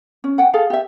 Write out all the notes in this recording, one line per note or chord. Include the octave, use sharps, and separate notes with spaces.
C#4
F#5 G5
G#4 A4 F5
G4 E5